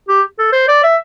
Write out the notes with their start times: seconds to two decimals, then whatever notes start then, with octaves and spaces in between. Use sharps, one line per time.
0.09 G4
0.39 A4
0.53 C5
0.68 D5
0.83 E5